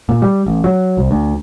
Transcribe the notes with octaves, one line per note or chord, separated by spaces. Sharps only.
A#2
G3
A1
F#3
C2
D2